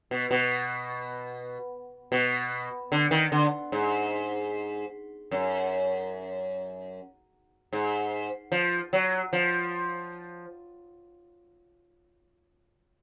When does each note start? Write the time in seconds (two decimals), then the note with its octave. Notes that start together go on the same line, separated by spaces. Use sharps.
0.11 B2
0.31 B2
2.12 B2
2.92 D3
3.11 D#3
3.32 D3
3.72 G#2
5.31 F#2
7.73 G#2
8.52 F3
8.93 F#3
9.33 F3